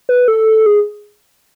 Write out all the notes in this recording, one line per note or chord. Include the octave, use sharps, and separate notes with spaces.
B4
A4
G#4